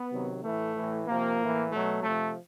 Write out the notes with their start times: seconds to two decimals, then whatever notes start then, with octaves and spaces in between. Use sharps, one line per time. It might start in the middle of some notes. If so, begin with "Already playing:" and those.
Already playing: B3
0.11 C3 D#3 F#3
0.43 A2 E3 A3
0.74 A2 E3
1.07 C3 F3 A#3
1.39 A2 E3
1.71 B2 F#3 A3
2.03 C3 F3 A3